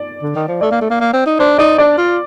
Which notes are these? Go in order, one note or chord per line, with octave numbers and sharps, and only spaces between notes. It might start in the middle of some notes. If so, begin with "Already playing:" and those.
Already playing: D5
D3
D#3
F3
A3 D5
A#3
A3
A#3
A#3
C4
D#4
D4 C5
D#4 D5
D4 D5
F4